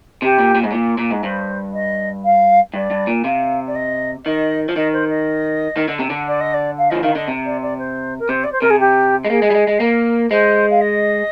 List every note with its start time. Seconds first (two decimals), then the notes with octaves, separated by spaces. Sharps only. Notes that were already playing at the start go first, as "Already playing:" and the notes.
0.22 C3 G4
0.39 A#2
0.55 A#2
0.64 G#2
0.71 A#2
0.98 A#2
1.11 G#2
1.23 G2 C5
1.73 D#5
2.24 F5
2.74 G2 D5
2.91 G2
3.07 A#2
3.24 C3 F5
3.66 D5
3.75 D#5
4.25 D#3 D#5
4.69 F3
4.76 D#3 D#5
4.93 C5
5.09 D#5
5.77 D#3
5.88 D3
5.99 C3
6.10 D3
6.27 D5
6.40 D#5
6.53 D5
6.78 F5
6.90 F3 D#5
7.03 D#3 F5
7.15 D3 D#5
7.28 C3
7.45 D5
7.62 D5
7.78 C5
8.19 A#4
8.29 C3 C5
8.43 D5
8.52 C5
8.61 C3 A#4
8.70 G#4
8.80 G4
9.25 G#3
9.29 A#3 G#4
9.42 G#3
9.50 G3
9.55 G#3
9.67 G#3
9.80 A#3 A#4
10.30 G#3 C5
10.70 F5
10.81 D#5